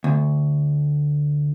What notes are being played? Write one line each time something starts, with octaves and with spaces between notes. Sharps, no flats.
D2